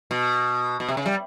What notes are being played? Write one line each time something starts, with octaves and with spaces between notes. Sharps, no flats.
B2
B2
C3
C#3
G3